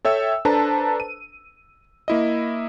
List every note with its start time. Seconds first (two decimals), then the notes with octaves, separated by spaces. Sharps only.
0.05 A4 C#5 E5 G5 E6
0.45 D4 A4 B4 C5 A5 A#5
1.00 D#7
2.08 A#3 E4 D#5